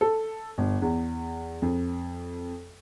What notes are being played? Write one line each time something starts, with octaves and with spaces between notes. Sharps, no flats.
A4
G1
E2
F2